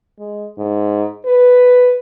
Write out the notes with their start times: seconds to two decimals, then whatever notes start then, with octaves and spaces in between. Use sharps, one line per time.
0.20 G#3
0.58 G#2
1.26 B4